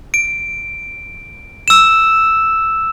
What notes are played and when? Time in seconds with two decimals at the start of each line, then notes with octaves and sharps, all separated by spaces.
0.14 D7
1.68 E6 E7